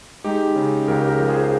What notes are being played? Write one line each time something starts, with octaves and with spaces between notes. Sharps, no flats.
G#3 D#4 G4
C#3
C#2 G4 A#4
G4 A#4
F3
G#4 C5
G#4